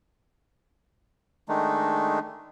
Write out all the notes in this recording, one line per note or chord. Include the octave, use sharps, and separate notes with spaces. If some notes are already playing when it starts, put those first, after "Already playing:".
D#3 G#3 A3 D4 D#4